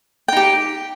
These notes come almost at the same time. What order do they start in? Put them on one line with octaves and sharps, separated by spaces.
G5 D#4 G4